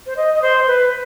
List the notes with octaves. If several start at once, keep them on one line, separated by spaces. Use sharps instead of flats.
C5
D#5
D#5
C5
B4